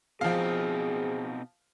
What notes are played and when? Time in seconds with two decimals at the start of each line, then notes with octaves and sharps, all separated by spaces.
0.21 B2 F3 C4 D#4 G#4 F5